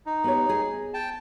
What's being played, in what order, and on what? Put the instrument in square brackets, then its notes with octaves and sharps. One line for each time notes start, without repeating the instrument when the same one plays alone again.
[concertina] D#4
[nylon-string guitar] B3 G4 C#5
G#4
[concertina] G5 A5